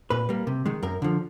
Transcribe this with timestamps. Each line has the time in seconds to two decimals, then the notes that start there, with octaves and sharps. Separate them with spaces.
0.10 A#2 B4
0.29 G3 A#3
0.47 C3
0.66 D#3 G#3
0.83 F#2 A#4
1.02 D3 F3